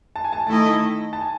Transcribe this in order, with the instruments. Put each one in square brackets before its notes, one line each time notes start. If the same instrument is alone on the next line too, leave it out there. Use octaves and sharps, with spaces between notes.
[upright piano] A5
G#5
A5
[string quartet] D#3 A3 E4 A4 D#5 [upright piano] A5
[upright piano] A5
G#5